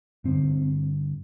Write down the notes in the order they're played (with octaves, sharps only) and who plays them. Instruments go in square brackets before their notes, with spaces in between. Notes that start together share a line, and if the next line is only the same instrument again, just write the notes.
[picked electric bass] G2 D3 C4